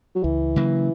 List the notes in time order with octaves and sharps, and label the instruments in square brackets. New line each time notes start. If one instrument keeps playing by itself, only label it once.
[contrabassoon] F#3
[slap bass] C#2 [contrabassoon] E3
[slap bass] C#3 F#3 A#3